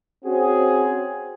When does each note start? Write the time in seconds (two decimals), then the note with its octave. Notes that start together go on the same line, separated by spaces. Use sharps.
0.25 C4 C#4 F#4 G#4